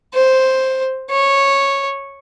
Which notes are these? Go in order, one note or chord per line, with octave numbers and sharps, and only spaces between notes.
C5
C#5